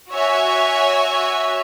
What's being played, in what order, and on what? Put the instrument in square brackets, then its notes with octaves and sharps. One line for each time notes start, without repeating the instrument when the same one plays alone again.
[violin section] F#4 C#5 E5 G#5